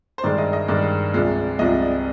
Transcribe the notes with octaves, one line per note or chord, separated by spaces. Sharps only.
C5
G2 D#3 G#3 D5
D#5
D#5
G2 D#3 G#3 D5
C2 C3 F3 G#3
C2 C3 F3 G#3 D#5